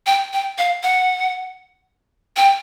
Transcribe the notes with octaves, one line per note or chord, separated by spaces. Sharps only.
G5
G5
F5
F#5
G5